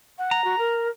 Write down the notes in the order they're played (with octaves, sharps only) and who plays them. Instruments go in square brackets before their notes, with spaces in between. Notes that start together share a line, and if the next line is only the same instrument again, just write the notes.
[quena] F#5
[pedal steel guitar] A#5
[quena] F#4
A#4